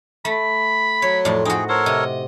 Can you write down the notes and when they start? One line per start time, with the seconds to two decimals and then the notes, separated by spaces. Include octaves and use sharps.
0.25 A3 B5
1.02 F#3 C#5
1.25 F2 A2 D4
1.45 D#4 F#4 G#4 G5
1.69 A4 A#4 C5 C#5
1.86 C3 D#5